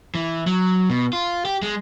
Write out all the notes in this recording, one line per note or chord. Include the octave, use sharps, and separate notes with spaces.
E3
F#3
B2
F4
G4
G#3